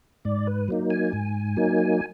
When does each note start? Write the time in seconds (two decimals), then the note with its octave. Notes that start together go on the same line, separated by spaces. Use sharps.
0.25 G#2 D5
0.47 B4
0.68 F#3 A#3 D#4
0.90 G#5
1.13 G#2
1.57 F#3 A#3 D#4